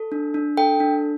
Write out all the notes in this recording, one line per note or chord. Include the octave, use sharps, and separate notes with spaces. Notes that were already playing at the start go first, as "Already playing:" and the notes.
Already playing: A4
D4
D4
A4 G5
D4